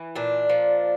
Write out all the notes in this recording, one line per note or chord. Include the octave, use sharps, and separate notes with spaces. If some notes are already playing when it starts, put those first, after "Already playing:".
Already playing: E3
A#2 D4
F3